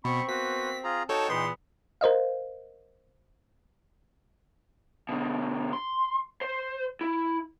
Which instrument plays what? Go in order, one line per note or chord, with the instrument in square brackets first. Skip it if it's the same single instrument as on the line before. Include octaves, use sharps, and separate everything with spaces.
[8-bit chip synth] B2 [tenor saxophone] C4 [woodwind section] B5 C#6
[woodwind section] A#3 B3 F#4 [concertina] B4 C5 [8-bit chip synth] B6
[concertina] F4 G#4 A#5
[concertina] D#4 G5 [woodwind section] F#4 F#5 A5 [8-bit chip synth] A4 C#5
[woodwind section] E2 A#2 E3 [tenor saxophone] B3 [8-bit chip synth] C6
[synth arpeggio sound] A#4 C5 D#5 F5
[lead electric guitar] B2 D3
C6
C5
E4